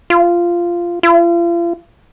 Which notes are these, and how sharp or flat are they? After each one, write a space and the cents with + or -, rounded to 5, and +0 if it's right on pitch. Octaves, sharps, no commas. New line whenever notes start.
F4 -10
F4 -40